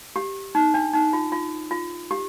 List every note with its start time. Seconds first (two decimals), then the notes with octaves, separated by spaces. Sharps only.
0.16 G4
0.55 D#4
0.74 D4
0.93 D#4
1.13 F4
1.32 F4
1.71 F4
2.11 G4